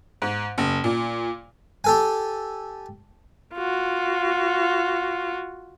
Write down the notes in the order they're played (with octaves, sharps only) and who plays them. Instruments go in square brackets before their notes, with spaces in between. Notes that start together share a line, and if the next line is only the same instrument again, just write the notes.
[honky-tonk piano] G#2
F#1
A#2
[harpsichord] G4 A4 G#5
[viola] F4 F#4